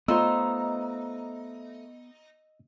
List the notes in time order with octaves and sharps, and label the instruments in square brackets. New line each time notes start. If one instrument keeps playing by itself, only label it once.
[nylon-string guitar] A3 F4 C5 [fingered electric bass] B3 [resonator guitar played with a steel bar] D#4 [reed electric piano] D#5 E6